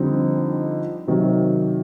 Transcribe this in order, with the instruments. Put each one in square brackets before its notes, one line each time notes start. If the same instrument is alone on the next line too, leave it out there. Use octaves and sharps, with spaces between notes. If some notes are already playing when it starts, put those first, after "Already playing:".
Already playing: [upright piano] F2 D3 G3 C4 D#4
C3 D#3 F#3